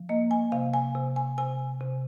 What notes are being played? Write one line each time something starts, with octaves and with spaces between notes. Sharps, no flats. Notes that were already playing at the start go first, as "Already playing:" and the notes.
Already playing: F3
A#3 D#5
G#5
C3 F5
G#5
C3
G#5
C3 G#5
C3